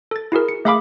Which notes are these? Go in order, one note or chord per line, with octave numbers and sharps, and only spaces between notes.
A4 A6
E4 F#4 G#4 A#4
C#7
A3 G#4 E5 F5 B5 D6